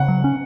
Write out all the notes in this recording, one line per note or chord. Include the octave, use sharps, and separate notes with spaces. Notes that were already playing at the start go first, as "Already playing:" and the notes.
Already playing: C#3 F#5
F#3
C#4